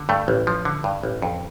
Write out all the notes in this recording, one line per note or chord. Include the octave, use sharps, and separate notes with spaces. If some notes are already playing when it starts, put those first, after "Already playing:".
Already playing: D3
G2 A3
A1
F3
D3
G2
A1
F2